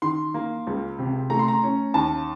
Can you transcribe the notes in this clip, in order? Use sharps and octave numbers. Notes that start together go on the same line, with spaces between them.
D#3 C6
A#3
C#2
C3
A3 A#5
C6
A#5
C#4
D#2 A5